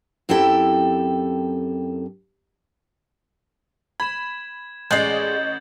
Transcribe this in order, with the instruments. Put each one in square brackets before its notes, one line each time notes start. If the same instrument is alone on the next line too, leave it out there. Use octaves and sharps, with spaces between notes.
[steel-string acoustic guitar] F#2 C4 E4 G4 A4 G5
[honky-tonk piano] B5 [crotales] G#6 E7
[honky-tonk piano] A1 D#5 C7 [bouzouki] G#3 D5 [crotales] G6 A6 F#7